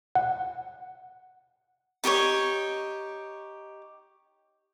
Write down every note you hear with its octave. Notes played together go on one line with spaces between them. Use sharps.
F#5
D#4 G4 B4 C#5